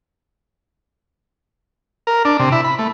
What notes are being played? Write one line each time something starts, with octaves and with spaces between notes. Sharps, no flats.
A#4
D4
C3
E4
B5
A3